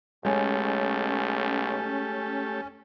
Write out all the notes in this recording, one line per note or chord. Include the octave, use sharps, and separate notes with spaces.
B1 G#3 A3 C#4 G4 A4 C#5 G#5